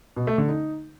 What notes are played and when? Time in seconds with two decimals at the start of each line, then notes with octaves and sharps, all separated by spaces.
0.16 B2
0.27 A3
0.38 D3
0.49 D#4